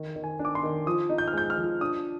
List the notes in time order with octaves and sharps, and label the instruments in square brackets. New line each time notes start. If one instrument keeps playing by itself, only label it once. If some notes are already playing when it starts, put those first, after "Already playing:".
Already playing: [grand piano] D#3
D#3
G#5
D4
D6
C6
D#3
F3 D#6
D#4
G6
F6
G#3 G6
F6
F3
D4 D#6